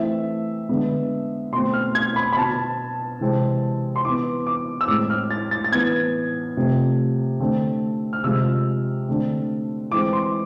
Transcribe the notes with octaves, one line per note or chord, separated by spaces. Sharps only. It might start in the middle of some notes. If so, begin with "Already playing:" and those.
Already playing: E3 A3 C4 E5
D3 G#3 B3
B2 A3 C4 C6
F6
G#6
B5
B5
B2 B3 A5
C3 E3 G#3 C4
C6
E3 B3 D6
D6
E6
A2 G#3 C4 D6
F6
A6
A6
A6
E3 B3 G#6
C3 F3 A3 C4
D3 A3 C4
F6
C3 F3 G#3 C4 E6
D3 A3 C4
E3 G#3 C4 D6
C6